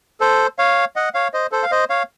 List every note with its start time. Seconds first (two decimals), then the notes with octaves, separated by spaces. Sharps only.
0.20 A4 C5
0.59 C#5 F5
0.96 D#5 F#5
1.14 C#5 F5
1.33 C5 D#5
1.52 A4 C5
1.63 F5
1.71 C5 D#5
1.90 C#5 F5